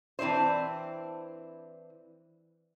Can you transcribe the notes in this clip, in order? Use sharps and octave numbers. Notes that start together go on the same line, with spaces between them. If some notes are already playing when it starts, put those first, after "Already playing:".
E3 C4 D4 E4 C5